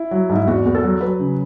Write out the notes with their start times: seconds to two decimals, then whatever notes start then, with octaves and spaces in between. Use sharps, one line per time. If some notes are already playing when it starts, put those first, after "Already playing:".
Already playing: E4
0.11 F#3
0.29 G#2
0.35 E4
0.47 E2 F#4
0.66 E2
0.75 A4
0.83 F#3
1.01 F#3 B4
1.19 C#3